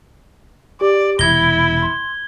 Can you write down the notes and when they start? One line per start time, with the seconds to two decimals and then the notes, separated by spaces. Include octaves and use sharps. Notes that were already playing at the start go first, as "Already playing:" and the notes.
0.81 G4 D5
1.19 E1 C3 E4 G#6 A#6 G7
1.82 C6